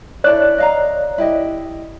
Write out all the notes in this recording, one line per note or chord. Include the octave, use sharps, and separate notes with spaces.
D4 E4 A4 C#5 D5 F#6
D#5 F5 A#5
E4 G4 D#5